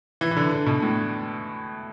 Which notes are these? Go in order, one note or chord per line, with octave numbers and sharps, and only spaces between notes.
E3
E3
D3
D3
B2
A2